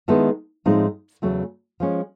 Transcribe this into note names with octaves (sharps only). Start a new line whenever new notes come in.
D#3 G#3 B3 E4 A4
A2 F3 G#3 C4 D#4
E2 C#3 F#3 A3
F3 G#3 C#4